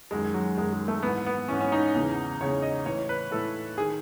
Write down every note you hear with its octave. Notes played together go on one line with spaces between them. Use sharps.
F#2 D#3 G#3
F#3
F#2 D#3 G#3
G#3
A3
G#2 E3 B3
B3
G#2 E3 C#4
C#4
D#4
E2 C#3 E3
E2 C#3 E3 C#5
D#5
A2 E3 C#5
B4
A2 E3 A4
D#3 G#4